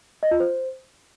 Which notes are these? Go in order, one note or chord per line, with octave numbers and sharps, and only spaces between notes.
D#5
F4
C5